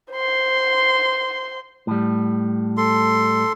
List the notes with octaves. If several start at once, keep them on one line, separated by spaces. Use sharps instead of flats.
C5 C6
A2 G3
A4 C6